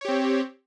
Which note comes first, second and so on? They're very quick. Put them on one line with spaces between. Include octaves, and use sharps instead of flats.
C#5 G4 C4